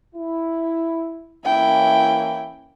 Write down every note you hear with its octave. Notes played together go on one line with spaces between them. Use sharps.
E4
E3 A#3 C#4 E4 G5